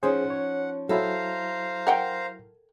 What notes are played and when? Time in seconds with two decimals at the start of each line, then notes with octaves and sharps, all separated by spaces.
0.03 F3 C#4 D#4 G#4 C5 F#5
0.30 C#5
0.89 F#3 E4 A4 C5 F5 A#5
1.87 A#4 F#5 G5